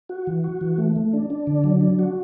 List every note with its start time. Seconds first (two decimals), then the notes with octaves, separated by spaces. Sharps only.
0.09 F#4
0.27 E3
0.44 F#4
0.61 E3
0.78 A3
0.96 A3
1.13 D4
1.30 D4
1.47 D3
1.64 F#3
1.81 D4
1.99 F#4